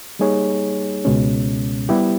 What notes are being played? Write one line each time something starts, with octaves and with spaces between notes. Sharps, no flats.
G3 A#3 D#4 G#4 C#5
C#2 B2 G#3 C#4
G3 B3 E4 G4